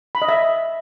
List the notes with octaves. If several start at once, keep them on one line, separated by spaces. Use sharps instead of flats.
B5
D#5
E5